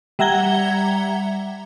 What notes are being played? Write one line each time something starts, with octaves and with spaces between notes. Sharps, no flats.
G3 E5 F#5 A#5 G#6 G7